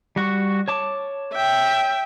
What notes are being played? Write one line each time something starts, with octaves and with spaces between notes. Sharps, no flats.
G3 F#4 C#6
C#5 A5 D6
E5 G5